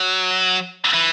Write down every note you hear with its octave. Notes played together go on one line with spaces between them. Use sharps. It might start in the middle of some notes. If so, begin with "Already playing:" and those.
Already playing: F#3
E3